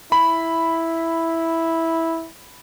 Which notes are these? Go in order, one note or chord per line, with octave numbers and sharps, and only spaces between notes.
E4 B5